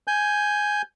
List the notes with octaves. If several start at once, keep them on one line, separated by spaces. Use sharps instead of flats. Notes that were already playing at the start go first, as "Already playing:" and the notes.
G#5 G6